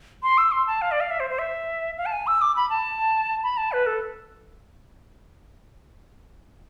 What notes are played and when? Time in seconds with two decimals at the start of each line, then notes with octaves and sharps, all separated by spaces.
0.23 C6
0.38 E6
0.52 C6
0.67 A5
0.82 F5
0.91 D5
1.01 F5
1.11 E5
1.20 C5
1.30 C5
1.39 E5
1.98 F5
2.06 A5
2.12 G#5
2.27 E6
2.41 D6
2.56 B5
2.70 A5
3.43 B5
3.57 A5
3.72 B4
3.86 A4